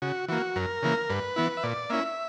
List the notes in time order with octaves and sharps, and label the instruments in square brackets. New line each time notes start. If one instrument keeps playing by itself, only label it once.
[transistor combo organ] C#3 F#4
E3 A#3 F#4
F#2 A#4
C#3 E3 A#3
G2 B4
E3 B3 E4
E5
A#2 D5
A#3 C#4 E4 E5